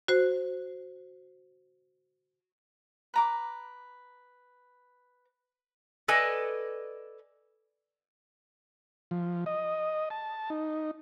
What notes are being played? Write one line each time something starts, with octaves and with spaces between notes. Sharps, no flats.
F#4 C5
B4 A#5 D6
A4 B4 D5 D#5 G#5
F3
D#5
A5
D#4